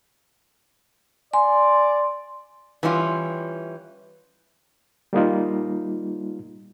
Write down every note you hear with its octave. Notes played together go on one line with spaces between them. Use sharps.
D5 G#5 C6
E3 G3 C#4 F4
G3 A#3 D#4 F4